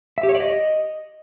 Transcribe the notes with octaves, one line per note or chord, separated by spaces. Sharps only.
E5
G4
C#5
D5
D#5